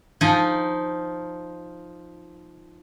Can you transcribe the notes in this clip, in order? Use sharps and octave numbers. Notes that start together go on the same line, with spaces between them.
F3 D#4 G#5